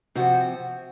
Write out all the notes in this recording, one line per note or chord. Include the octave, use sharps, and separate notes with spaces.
C3 F3 F#4